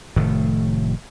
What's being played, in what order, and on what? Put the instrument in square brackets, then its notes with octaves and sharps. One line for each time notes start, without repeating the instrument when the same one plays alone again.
[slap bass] F1 A2 D#3 A3